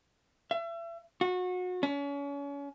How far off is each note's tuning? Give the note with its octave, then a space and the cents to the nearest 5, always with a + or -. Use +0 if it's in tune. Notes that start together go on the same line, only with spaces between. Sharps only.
E5 +35
F#4 -30
C#4 +35